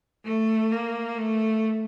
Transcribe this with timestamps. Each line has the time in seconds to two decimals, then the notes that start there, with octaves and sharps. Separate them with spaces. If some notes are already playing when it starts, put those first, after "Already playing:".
0.24 A3
0.71 A#3
1.18 A3